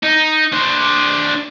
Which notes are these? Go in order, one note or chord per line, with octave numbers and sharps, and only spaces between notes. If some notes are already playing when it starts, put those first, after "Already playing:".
D#4
D4 C5